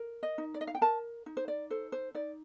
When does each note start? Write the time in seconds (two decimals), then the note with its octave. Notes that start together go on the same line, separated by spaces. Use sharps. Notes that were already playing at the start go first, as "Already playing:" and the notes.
Already playing: A#4
0.23 D#5
0.38 D#4
0.54 D5
0.61 D#5
0.67 F5
0.75 G5
0.81 A#4 A5
1.26 D#4
1.37 C5
1.48 D5
1.70 A4 C5
1.92 C5
2.15 D#4 D5